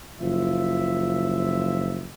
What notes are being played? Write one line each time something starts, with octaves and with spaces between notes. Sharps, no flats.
F#1 F3 F4 E5